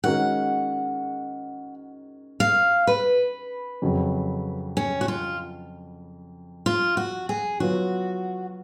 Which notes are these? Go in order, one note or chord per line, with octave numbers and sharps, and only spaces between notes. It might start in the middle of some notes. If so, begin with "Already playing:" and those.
D#3 G#3 C#4 F#4 A#4 F#5
F5
B4
F2 C#3 F#3
C#4
F#4
F4
F4
F#4
G#4
F#3 B3 F4 F#4